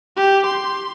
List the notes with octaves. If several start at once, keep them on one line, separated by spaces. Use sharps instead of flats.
G4
C6